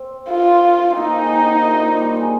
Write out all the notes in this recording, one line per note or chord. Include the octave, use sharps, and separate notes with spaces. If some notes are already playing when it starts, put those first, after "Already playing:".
Already playing: C4
F4
C4
A#3 D#4
G#3
D#3
D3
C3
A#2
A#2
G3
G#3